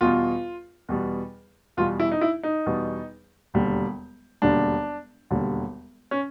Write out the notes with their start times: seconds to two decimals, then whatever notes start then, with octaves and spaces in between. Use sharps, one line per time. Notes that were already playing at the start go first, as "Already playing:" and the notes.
0.01 E2 B2 G3 F4
0.89 E2 B2 G3
1.77 E2 B2 G3 F4
2.00 E4
2.12 D#4
2.21 E4
2.43 D#4
2.66 E2 B2 G3
3.54 E1 D#2 D3 G3
4.42 E1 D#2 D3 G3 D4
5.30 E1 D#2 D3 G3
6.11 C#4